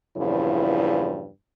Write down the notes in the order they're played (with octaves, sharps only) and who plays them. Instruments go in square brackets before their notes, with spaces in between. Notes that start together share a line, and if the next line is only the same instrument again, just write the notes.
[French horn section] E2 G2 A#2 C#3 F3 E4